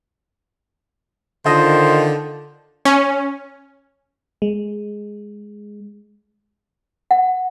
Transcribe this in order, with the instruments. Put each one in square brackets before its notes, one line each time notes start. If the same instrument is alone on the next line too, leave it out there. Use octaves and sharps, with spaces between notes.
[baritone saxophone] D3 [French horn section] D#3 F4 [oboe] C5 [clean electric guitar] D#5
[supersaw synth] C#4
[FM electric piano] G#3
[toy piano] F#5